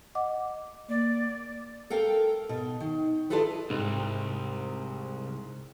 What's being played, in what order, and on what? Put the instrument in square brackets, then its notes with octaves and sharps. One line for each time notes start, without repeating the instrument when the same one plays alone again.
[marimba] D#5 F#5 D6
[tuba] A#3 [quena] D5
[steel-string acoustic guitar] A4 A#4 F5 G5
B2
D#3
D4 E4 F4 G#4 A4 B4
[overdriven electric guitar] C2 [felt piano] G#2